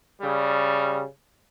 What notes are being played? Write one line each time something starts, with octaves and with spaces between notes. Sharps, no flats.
C#3 G3